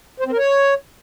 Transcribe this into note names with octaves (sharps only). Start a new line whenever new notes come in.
C5
C4
A#4
C#5